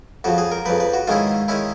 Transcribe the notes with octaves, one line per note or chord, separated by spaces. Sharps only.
F2 C#3 F3 F#4
G#4
A#4
F2 C#3 F3 B4
B4
F#4
G#2 D#3 G#3 C#4 E4 F4
D#3 G#3 C#4 E4